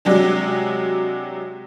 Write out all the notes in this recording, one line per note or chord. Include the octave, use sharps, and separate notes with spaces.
C3 F#3 G#3 D4